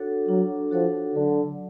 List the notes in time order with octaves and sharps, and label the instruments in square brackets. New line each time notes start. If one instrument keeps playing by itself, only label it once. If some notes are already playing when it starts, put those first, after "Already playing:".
Already playing: [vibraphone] D4 F#4 A4 C#5 F#5
[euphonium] F#3 [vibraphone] D4
[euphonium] F3 [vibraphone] F#4 A4 C#5 F#5
[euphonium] D3 [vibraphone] F#3